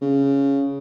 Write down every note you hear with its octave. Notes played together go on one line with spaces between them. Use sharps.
C#3